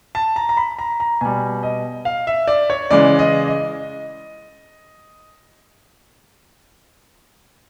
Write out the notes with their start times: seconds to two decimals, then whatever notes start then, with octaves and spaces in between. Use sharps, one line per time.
0.15 A5
0.36 A#5
0.49 A#5
0.57 B5
0.79 A#5
1.00 A#5
1.21 B2 G3 G#5
1.63 D#5
2.05 F5
2.27 E5
2.47 D5
2.70 C#5
2.91 C#3 E3 G#3 D5
3.19 D#5
3.48 D#5